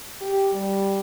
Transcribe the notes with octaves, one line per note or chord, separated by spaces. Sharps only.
G4
G3